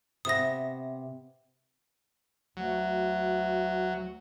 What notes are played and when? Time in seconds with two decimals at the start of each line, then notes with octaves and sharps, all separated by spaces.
0.25 C3 B3 E5 D#6 A#6
2.57 D2 F#3